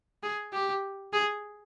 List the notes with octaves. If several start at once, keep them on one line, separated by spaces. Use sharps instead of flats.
G#4
G4
G#4